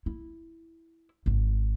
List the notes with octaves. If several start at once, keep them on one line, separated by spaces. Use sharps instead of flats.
E4
G#1